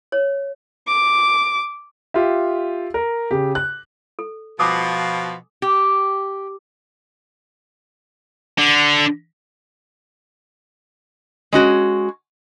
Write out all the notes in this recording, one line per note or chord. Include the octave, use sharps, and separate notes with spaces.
C#5
D6
F4 G4 E5
A#4
C#3 G4
F#6
A4
B2 F3 G#5 D6 D#6
G4
D3
G#3 C#4 F#4